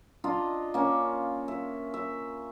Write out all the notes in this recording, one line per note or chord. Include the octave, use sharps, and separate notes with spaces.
D4 F4 D#5 A#5
A#3 C#4
E5
E5